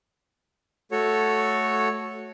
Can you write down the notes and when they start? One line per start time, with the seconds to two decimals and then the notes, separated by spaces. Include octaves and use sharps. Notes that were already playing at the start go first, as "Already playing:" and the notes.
0.92 A3 F#4 A4 C#5